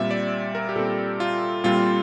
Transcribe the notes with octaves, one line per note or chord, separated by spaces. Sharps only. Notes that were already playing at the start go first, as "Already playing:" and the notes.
Already playing: A#2 G3 C4 E5
D5
A#4
G4
A#2 G3 C4 A4
F4
A#2 G3 C4 F4